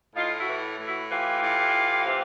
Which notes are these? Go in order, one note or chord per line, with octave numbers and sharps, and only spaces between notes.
A2 D#4 F4
E4 F#4
E3
A2
E4 F#4
E3 F4 G4
A2
E3
C3